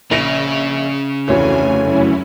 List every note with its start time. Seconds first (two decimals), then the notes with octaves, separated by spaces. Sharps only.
0.11 A#1 C#3 A#6
1.28 F1 D2 E3 C#5 G#5
1.81 F#2 C#4 E4